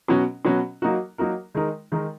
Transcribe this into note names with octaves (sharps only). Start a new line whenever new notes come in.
B2 F#3 C#4 F#4
B2 F#3 C#4 F#4
F#3 A#3 D#4 F#4 A#4
F#3 A#3 D#4 F#4 A#4
D#3 G#3 D#4 A#4
D#3 G#3 D#4 A#4